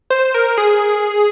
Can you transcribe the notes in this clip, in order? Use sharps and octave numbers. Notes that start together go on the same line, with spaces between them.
C5
A#4
G#4